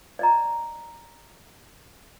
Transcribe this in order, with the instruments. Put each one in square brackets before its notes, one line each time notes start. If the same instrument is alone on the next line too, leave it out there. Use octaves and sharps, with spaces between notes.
[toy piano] D5 D#5 A#5